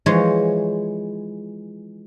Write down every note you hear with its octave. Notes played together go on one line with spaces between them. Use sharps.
E3 F3 G#3 C#5